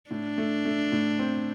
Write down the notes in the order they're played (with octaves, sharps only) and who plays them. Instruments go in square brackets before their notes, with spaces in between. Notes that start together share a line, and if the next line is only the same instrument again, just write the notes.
[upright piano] A2 [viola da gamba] D4
[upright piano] A3
A3
A2
C4